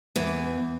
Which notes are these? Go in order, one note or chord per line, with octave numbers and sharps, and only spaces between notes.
E2 E3